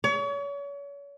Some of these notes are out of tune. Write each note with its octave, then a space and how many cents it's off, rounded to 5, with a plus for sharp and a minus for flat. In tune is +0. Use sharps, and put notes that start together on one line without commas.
C#5 +35